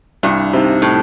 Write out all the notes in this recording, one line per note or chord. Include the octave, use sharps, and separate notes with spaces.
C2 G2
C3 D#3
A2